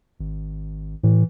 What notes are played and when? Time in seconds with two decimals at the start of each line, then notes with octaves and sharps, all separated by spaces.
0.20 G#1
1.03 A2 E3